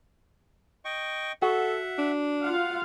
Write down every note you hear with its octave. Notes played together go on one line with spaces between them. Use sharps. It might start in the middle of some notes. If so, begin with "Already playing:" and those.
D#5 G5 C#6
F#4 A4 E5 F#5
D4
F4 F5 F#5